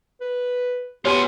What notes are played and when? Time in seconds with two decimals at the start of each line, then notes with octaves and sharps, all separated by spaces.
0.21 B4
1.05 B2 F4 G4 C#5 G#5